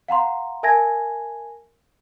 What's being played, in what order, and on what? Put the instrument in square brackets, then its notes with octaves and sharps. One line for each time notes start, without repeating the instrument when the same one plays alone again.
[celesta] F5 F#5 A#5 C6
A#4 E5 G#5 A5 G#6 A#6